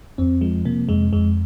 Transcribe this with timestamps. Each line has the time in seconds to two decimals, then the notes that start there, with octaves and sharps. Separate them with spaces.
0.18 F2 C4
0.41 F3 G#3
0.65 C3 A#3
0.89 F2 G#3
1.13 F2 G#3